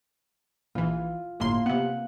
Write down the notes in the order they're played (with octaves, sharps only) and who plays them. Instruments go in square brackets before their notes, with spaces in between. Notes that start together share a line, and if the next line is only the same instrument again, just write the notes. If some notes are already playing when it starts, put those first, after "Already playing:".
[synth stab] A#1 E3 [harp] F4
[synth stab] G1 A2 C6 [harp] A#3
[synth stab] C3 B3 [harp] F#5